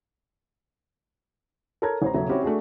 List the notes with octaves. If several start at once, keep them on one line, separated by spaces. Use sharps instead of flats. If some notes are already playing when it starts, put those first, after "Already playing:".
A4 A#4 C#5 A5 A#5 G#6
A1 C5 A#5
E1 C#3 F#3 A4 E5 A#5
C4 C#4 E4 F#4 G4
A3 D4 F#4 G#4